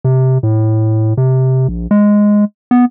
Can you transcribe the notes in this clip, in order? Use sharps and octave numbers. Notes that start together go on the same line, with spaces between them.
C3
A2
C3
A#1
G#3
B3